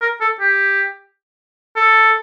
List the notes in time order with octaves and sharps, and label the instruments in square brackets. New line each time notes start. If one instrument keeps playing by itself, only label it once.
[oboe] A#4
A4
G4
A4